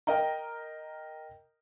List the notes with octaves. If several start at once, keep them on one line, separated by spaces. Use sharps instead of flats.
A#4 D#5 G5 A#5